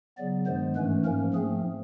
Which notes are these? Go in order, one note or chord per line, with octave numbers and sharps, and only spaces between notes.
C#3 F#3 B3 D5
G2 D#3 G#3 B3 C5
G#2 E3 A3 C#4 B4
G#2 F3 A#3 C#4 A#4
G#2 F3 A3 C4 G#4